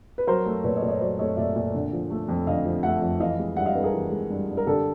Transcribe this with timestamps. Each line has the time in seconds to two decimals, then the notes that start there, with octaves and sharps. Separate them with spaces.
0.18 B4
0.27 F#3 A#4 C5
0.46 A3
0.64 A#2 B4 C#5
0.76 C#5 D#5
0.82 A#2 D5
0.88 C#5 D#5
1.00 F#3 C5 D5
1.19 A3 C#5 D#5
1.37 A#2 D5 E5
1.56 A#2
1.74 D3
1.93 F3
2.10 A3
2.29 F2
2.47 D3 D#5 F5
2.65 F3
2.83 A3 E5 F#5
3.02 F2
3.20 E3 D#5 F5
3.39 G#3
3.56 G2 E5 F#5
3.66 D#5 F5
3.75 G2 A4 B4
3.84 G#4 A#4
3.93 E3
4.11 G#3
4.30 G2
4.48 G2
4.57 A#4
4.67 D3 G4 A4